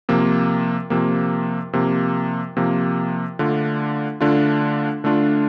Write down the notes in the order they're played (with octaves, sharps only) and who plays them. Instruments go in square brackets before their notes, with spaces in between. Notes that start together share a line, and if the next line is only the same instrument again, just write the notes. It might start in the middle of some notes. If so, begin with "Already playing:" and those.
[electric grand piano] C3 F3 A#3
C3 F3 A#3
C3 F3 A#3
C3 F3 A#3
D3 A3 D4 F4
D3 A3 D4 F4
D3 A3 D4 F4